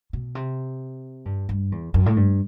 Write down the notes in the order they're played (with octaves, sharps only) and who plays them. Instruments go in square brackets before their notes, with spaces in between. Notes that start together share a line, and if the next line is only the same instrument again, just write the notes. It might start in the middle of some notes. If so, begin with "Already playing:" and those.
[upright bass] B2
C3
G2
G2
E2
F#2
A2
G2